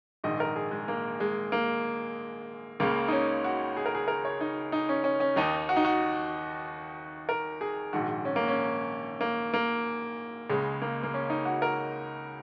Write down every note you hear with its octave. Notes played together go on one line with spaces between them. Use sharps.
A#1 G#2 D#3 D#5
A#4
G#4
G#3
A#3
G#3
A#3
C#2 C#3 A#3
D#4
C#4
F#4
G#4
A#4
G#4
A#4
C#5
D#4
D#4
C#4
C#4
C#4
D#2 D#3 D#4
F#4
D#4
F#4
A#4
G#4
A#1 G#2 D#3 F#4
C#4
A#3
C#4
A#3
A#3
C#2 C#3 G#3
A#3
A#3
C#4
D#4
F#4
A#4